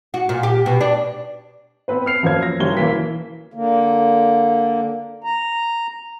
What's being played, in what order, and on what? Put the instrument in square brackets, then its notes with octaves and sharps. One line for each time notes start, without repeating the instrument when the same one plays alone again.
[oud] F#4
A#2
G4
B2
D4
[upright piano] B3 C4 B4 C5
F6 C7 F7
F#2 F3 A#3 C5 G#6
A#6
F#1 F#2 G3 A#3 C#5 G7
B1 E3 A#3 B6
[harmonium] D3 A#3
A#5